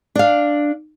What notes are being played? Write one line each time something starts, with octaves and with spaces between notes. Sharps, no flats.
D4 F5